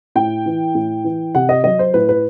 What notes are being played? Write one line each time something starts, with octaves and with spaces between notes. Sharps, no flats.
A2 G5
E3
A2
E3
C3 F#5
D#5
F#3 D#5
C5
A2 B4
B4